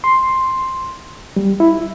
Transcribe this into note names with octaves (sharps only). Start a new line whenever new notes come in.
C6
G3
E4